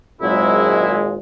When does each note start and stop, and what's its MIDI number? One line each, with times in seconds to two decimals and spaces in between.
0.22 1.18 32
0.22 1.18 46
0.22 0.98 54
0.22 1.18 56
0.22 0.98 64